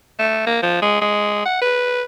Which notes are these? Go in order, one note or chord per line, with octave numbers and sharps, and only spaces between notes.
A3
A#3
F3
G#3
G#3
F#5
B4